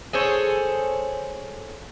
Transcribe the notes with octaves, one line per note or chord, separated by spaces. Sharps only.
G#4 A4 C5 C#5